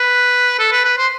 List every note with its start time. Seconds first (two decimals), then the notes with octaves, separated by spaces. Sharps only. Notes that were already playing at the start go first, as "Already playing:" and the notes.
Already playing: B4
0.59 A4
0.72 B4
0.85 B4
0.98 C5